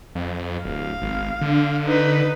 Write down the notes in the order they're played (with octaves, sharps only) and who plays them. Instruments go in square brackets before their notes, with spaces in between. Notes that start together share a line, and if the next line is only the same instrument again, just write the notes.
[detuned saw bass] F2
[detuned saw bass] D1 [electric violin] F5
[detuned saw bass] G#1
D3
[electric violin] D#4 B4